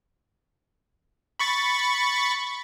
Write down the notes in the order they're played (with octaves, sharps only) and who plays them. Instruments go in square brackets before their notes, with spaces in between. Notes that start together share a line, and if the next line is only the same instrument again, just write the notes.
[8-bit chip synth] B5 C#6 A6